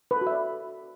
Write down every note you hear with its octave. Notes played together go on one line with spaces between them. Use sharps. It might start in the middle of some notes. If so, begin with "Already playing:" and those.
B4
A4
F#4
E5
D5